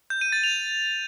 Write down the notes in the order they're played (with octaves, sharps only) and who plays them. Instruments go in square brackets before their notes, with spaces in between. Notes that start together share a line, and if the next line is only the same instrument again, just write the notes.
[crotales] G6
D#7
A6
F7